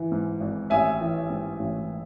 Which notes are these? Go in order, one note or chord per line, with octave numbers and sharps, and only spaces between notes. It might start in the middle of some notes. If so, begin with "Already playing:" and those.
Already playing: E3
G#2
G#1
A1 E5 G#5
E3
G#2
A1